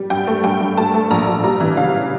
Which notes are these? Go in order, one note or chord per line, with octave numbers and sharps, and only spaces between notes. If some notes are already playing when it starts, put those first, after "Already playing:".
Already playing: G3
G2 G5
A3
G2 G5
G2
A3 A5
A3
A#1 A#5
A#1
G3 A#5
E3
C#3 F5